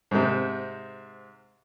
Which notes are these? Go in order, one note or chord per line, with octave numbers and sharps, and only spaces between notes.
G#2 C3